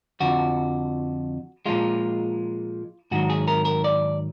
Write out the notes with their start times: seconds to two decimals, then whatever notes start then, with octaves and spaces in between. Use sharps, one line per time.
0.20 F2 D3 F3 F#4
1.66 A#2 F3 G#3 F4
3.11 G#2 D#3 F#3 F#4
3.30 G#4
3.48 A#4
3.65 A#4
3.84 D5